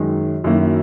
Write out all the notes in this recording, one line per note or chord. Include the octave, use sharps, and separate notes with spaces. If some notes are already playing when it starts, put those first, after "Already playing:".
Already playing: F#2 D#3 G#3
F#2 D#3 F#3 A#3 E4